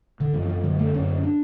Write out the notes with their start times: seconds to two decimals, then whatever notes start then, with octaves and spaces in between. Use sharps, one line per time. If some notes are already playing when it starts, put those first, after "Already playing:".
0.20 D3
0.33 F#2 F3
0.50 F3
0.64 D3 F#3
0.79 A3
0.94 F#2 C#4
1.24 D4